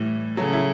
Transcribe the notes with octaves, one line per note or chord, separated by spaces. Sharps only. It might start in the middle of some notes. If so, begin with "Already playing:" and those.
Already playing: A2 E3 G3
C#3 F#3 A3
E4